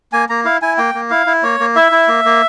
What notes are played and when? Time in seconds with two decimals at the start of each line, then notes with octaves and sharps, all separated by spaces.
0.13 A#3 G#5
0.29 A#3 A#5
0.45 E4 F5
0.62 E4 G#5
0.78 A#3 G5
0.94 A#3
1.10 E4 F5
1.27 E4
1.43 A#3 C#5
1.60 A#3
1.76 E4 E5
1.92 E4
2.08 A#3
2.25 A#3